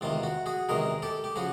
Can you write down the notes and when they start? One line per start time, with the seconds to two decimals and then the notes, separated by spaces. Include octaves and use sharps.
0.01 E2 C3 D#3 G#3 F4
0.23 F#4
0.46 F#4 G#4
0.69 E2 C3 D#3 G#3 G#4 A#4
1.02 G4 A4
1.24 G4
1.36 C#3 F3 F#4 G#4